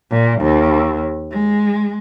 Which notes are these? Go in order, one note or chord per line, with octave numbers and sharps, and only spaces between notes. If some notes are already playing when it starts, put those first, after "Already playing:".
A#2
D#2
G#3